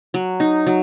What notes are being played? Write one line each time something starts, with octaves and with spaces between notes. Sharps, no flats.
F#3
D#4
F#3